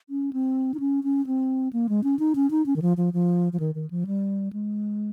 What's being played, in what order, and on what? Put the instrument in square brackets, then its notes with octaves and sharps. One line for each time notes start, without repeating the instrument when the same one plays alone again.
[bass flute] C#4
C4
D#4
C#4
C#4
C4
A#3
G#3
C#4
D#4
C#4
D#4
C#4
D#3
F3
F3
F3
F3
D#3
D#3
F3
G3
G#3